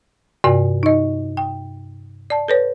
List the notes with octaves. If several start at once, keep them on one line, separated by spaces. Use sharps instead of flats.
G2 C3 F#4 D5 G#5
D#4 D#5
G5
D5 A5
A4 B4 C#5